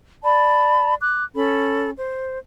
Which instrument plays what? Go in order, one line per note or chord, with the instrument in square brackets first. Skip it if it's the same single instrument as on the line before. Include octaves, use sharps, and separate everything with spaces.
[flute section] D5 A5 B5
D6 F#6
C#4 A4 B5
C5